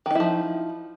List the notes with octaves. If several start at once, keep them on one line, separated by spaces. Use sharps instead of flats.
D#3 F3 D#4 E4